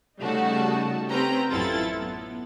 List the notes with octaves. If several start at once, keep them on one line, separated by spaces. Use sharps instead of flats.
C#3 G3 A3 D#4 F#4 A5
C4 C#4 G4 B4 G5 A#5
A1 F#2 E4 F4 A4 A6
B3